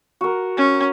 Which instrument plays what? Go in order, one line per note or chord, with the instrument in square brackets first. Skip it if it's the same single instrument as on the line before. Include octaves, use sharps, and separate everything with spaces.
[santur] F#4 A#4
[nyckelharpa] C#4